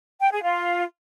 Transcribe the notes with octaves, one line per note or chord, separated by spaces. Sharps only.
G5
G#4
F4